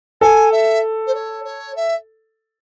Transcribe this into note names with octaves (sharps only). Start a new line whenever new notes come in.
A4 G#5
E5
C5
C#5
C#5
E5